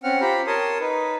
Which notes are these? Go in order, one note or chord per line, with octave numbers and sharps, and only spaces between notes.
C4 C#4 F#5 F6
F4 G4 C5 A#5 B5
A#4 C#5 A5 C6 D#6
D#4 B4